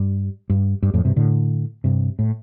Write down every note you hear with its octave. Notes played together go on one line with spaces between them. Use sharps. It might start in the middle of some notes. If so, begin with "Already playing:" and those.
Already playing: G2
G2
G2
F2 A2
G2 C3
A2 D3
G2 C3
A2